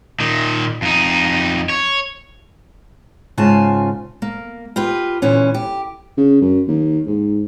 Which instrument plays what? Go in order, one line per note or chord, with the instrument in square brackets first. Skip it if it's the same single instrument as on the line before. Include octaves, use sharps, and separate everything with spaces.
[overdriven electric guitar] A#2 D#3
F2 D#4
C#5
[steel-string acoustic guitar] G#2 C#3 F4 G#5 A5
A#3
F4 G4 B4
D2 A#2 E3 C#4
G4
[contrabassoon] C#3
F#2
D#2
G#2